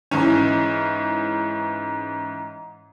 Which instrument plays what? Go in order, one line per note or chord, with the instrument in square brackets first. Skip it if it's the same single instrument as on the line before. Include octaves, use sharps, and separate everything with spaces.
[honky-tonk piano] G#2 E3 C#4